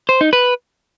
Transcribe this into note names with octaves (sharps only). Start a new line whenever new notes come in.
C5
D#4
B4